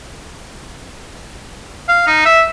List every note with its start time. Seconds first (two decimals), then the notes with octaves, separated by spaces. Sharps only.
1.89 F5
2.07 D#4
2.26 E5